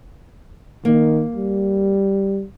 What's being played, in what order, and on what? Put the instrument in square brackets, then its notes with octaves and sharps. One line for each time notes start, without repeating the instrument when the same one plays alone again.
[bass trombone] D#3 [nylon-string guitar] A#3
[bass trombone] G3